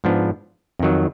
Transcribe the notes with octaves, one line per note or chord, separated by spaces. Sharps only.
G#2 F3 B3 D4
F2 D#3 F#3